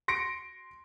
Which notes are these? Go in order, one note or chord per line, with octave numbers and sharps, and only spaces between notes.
C6 A#6 C#7 D7